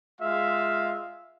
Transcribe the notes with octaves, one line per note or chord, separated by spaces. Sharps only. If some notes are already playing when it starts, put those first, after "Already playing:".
G#3 F4 E5 F5